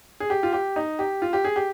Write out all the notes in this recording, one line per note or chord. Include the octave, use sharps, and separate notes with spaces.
G#4
G4
F4
G4
D#4
G4
F4
G4
G#4
G4